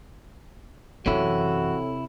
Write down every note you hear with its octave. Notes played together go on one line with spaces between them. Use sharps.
F#2 C3 E3 C4 E4 F#4 A4 C#5